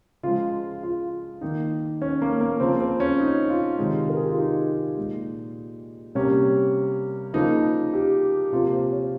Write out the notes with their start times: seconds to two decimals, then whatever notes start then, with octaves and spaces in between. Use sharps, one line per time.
0.23 C#3 F3 G#3 F4
0.83 F4
1.41 D#3 A#3 D#4
2.02 C#4
2.22 A#3
2.41 A#3
2.60 C#3 F3 A#3 C4
2.80 C4
3.00 C#4
3.20 D#4
3.50 F4
3.78 C3 D#3 G#3
4.10 A#4
4.16 G#4
4.23 G4
4.31 F4
4.39 D#4
4.97 A#2 G#3
6.15 C3 G3 A#3 C#4
7.34 C#3 F3 A#3 D#4
7.94 G4
8.53 C3 F3 A#3 F4
8.73 C5
8.92 C#5